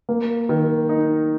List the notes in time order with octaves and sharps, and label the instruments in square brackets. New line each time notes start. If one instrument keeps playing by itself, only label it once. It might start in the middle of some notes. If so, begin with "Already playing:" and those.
[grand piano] A#3
D#3
D#4